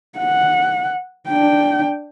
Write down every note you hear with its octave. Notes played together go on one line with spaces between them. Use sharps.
F#5
D4 G5